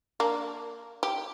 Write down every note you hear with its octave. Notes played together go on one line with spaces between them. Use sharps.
A#3 D4
G4